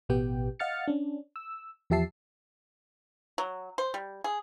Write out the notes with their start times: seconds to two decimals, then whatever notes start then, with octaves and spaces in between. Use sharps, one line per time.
0.09 A1 B2 B3 G4 G5
0.59 D#5 F5 F#5 F6 A6 C#7
0.87 C#4 D4
1.36 E6
1.90 E2 F3 G4 E5 A5 C7
3.38 F#3
3.78 C5
3.94 G3
4.24 G#4